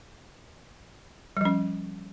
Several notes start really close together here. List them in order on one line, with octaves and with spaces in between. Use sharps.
G3 F3 C#4